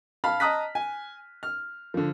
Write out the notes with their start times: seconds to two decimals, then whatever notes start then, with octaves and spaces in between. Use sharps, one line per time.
0.24 F5 A5 B5 F6
0.40 D#5 A5 A#5 D#6 F#6 B6
0.75 G#5
1.43 F6
1.94 D3 F3